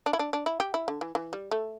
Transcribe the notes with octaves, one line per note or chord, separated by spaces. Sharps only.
D4
E4
D4
D4
E4
G4
E4
D3
E3
E3
G3
A3